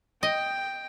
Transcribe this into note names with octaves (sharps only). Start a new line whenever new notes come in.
D#5 G5